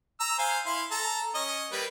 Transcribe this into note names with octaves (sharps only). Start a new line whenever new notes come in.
A#5 E6
C5 F5 G#5
E4 F5 C6
A4 A#5
C#4 D#5
G3 A#3 B4